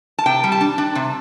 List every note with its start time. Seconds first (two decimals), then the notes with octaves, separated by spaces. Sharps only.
0.18 A5
0.26 C3 G5
0.44 G3
0.52 A5
0.61 D4
0.78 D4
0.95 C3